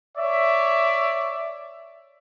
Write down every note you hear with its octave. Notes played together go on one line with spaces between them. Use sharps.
C#5 D5 E5